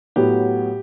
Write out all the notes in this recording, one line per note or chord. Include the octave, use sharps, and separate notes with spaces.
A2 F#3 B3 G4